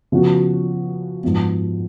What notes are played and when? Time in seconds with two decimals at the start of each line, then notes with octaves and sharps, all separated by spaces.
0.12 C#3 F3 B3 F#4
1.23 G#2 F3 B3